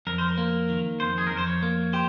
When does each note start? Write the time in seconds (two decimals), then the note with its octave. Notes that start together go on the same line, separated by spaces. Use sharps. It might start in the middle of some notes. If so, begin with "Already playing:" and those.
0.07 F2 A#4
0.18 C5
0.28 A#4
0.38 A#3
0.69 D#3
1.00 F2 C5
1.18 G#4
1.27 F2 A#4
1.37 C5
1.47 C#5
1.63 A#3
1.93 G4 C5